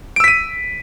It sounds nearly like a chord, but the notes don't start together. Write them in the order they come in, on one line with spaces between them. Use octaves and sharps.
D7 E6 B6 D#7